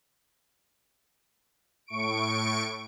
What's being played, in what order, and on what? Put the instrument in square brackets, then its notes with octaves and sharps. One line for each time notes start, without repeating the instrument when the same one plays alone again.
[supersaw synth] A2 C#6 D7